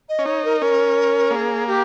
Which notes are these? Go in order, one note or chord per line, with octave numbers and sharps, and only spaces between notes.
D#5
C#4
D#4 C#5
A#4
C#4 A#4
A#3 G#4
G4